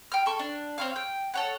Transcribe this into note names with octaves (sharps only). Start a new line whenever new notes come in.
G5 F6
A4 C#6
D4
C4 C#5 F5
G5
A4 C#5 F#5